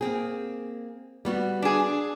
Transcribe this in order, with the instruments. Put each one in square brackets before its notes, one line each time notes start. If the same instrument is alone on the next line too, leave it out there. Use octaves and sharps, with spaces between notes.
[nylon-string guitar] A#3 C4 G#4
G3 B3 F#4
[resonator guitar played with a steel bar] D4 G#4